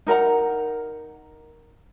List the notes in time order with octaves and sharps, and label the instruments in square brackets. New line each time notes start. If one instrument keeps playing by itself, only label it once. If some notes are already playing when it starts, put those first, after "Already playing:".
[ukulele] D#4 A#4 F#5 A#5